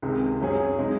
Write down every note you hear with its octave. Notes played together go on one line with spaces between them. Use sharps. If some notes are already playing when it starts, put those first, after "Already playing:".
C#2 C3 D#3 G#3
F#2 C#3 F#3 C#4 G#4
C#3 G#3 D#4